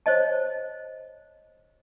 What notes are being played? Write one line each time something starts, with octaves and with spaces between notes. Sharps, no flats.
C5 C#5 D#5 A5